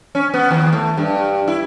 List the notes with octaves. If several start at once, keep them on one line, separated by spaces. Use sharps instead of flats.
C#4
B3
D#2
A3
G2
E4